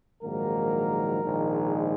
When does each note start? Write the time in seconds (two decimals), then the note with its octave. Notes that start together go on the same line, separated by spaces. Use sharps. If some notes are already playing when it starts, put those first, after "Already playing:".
0.23 A#1 G#2 D#3 F#3 A#3 A#4
1.23 A#1 G#2 D#3 G#3